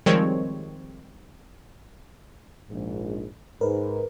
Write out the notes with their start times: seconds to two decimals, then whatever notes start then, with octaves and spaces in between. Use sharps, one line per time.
0.06 D#3 F3 G3 G#3 C4 C#5
2.71 A#1 G#2
3.61 G#2 A#4 B4